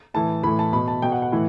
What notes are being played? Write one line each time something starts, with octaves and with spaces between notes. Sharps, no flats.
A2 E3 A5
A2 E3 B5
A5
B2 B5
A5
B2 G5
F#5
F#5
A2 E3